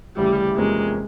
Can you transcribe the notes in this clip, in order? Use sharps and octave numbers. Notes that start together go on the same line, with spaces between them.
D2 C#3 E3 G3 A3
E2 C3 F3 G#3 A#3 C#4